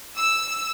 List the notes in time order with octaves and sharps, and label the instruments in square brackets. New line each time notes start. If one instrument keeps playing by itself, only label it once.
[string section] E6